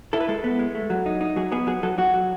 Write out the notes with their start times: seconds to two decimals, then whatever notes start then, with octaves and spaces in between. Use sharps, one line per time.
0.13 E4 A4
0.20 B4
0.28 G#3 A4
0.44 B3
0.59 G#3
0.75 A3
0.90 F#3
1.06 D#4
1.21 D#4
1.36 F#3 G#4
1.52 B3 G#4
1.67 F#3 G#4
1.83 F#3 A4
1.98 F#3 F#4
2.14 F#3